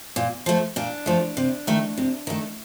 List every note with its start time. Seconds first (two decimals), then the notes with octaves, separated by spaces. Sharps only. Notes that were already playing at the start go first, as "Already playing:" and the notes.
0.16 A#2
0.46 F3 A3
0.76 A#2 D4
1.06 F3 A3
1.37 C3
1.67 D#3 A3
1.98 C3
2.27 D#3 A3